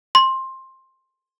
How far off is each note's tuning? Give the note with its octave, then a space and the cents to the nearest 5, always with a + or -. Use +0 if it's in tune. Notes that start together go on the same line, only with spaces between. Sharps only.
C6 +15